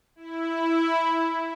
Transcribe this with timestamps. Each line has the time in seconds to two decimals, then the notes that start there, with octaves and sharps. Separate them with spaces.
0.16 E4